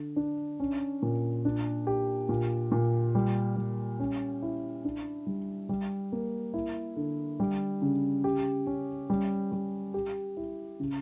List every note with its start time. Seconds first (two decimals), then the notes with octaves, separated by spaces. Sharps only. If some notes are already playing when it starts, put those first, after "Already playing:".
Already playing: D3
0.16 D4
0.60 C#4
1.03 A#2
1.45 D4
1.87 G4
2.29 A#2
2.72 A#2
3.15 G3
3.56 G3
4.00 C#4
4.42 E4
4.85 D4
5.27 G3
5.69 G3
6.12 A#3
6.54 E4
6.96 D3
7.40 G3
7.82 C#3
8.24 G4
8.67 C#4
9.10 G3
9.52 G3
9.94 G4
10.37 E4
10.80 C#3